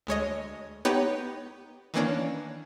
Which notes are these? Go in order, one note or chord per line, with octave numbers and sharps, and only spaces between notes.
D2 G#3 C#5 D#5
B3 D#4 G4 B4 C#5
D#3 E3 A#3 C#4 D4